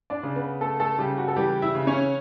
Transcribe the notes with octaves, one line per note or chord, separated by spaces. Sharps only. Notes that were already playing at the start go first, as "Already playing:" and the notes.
D4 D5
C#3
B3 B4
A3 B3 A4
A3 A4
C#3 G3 G4
F#4
A4
E3 G3 G4
E4 E5
C#3
C#4 C#5